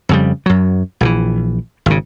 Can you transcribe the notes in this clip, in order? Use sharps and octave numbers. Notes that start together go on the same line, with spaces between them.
F2 C#3 G3
F#2 F#3
A#1 C#3 E3
G#1 C#3